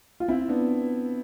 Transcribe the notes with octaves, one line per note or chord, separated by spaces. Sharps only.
F4
C4 E4
B3 D4